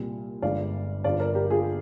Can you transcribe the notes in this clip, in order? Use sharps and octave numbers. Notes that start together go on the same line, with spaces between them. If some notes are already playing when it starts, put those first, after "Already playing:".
Already playing: C2 A#2 G3
G1 G2 F3 G#3 D5 F5
G1 G2 F3 D5 F5
A#4 D5
G4 A#4
F4 G#4